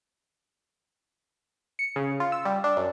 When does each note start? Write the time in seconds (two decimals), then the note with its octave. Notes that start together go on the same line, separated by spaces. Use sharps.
1.79 C#7
1.96 C#3
2.20 F4
2.32 E6
2.45 G3
2.64 D4
2.77 F#2